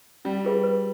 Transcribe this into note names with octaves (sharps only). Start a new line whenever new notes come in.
G3 C#4
F4 G#4 B4 E5
B4